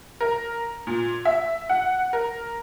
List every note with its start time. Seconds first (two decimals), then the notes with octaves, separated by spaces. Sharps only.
0.21 A#4
0.87 A#2
1.25 E5
1.69 F#5
2.13 A#4